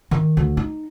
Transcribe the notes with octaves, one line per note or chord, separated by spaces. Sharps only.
D#3
D2
D#4